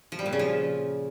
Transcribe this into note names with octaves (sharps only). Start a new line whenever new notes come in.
F3
G3
A#2
C#3
F3